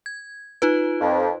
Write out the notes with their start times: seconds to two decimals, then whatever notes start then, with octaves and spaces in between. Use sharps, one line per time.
0.06 G#6
0.62 D#4 F4 B4
1.01 F2